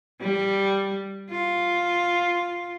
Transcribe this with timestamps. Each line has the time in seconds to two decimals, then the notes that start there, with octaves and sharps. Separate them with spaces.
0.22 G3
1.30 F4